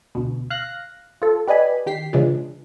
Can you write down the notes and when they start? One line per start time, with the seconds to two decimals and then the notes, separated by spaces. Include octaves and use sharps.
0.15 D2 B2
0.50 F5 F#6 A#6
1.22 F4 A4
1.48 G4 B4 D5 D#5 G#5 B5
1.86 D#3 G4 B6 C7
2.13 C#3 E3 G#3 D4 F4